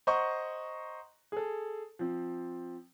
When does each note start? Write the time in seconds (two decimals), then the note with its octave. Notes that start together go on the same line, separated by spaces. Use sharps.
0.07 C5 D#5 F#5 A#5 C6 C#6
1.32 G#4 A4
1.99 F3 C4